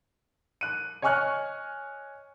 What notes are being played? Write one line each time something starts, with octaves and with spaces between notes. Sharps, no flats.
F#6 D#7
C#5 D#5 G#5 C#6 F6 F#6